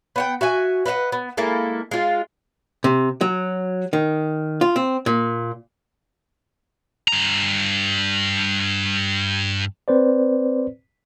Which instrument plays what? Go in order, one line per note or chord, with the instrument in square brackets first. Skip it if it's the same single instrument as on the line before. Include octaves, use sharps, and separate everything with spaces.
[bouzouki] B3 F#5 G5
F#4 E5 G#5
B4 D#5 E5 F#5
B3
G#3 A#3 E4 A4
G#3 F4
[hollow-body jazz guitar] C3
F#3
D#3
F4
C4
A#2
[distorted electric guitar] G2 A#5
[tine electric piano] C4 B4 C5 D5